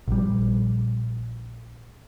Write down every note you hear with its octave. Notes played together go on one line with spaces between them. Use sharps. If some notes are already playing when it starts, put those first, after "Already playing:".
A#1 G3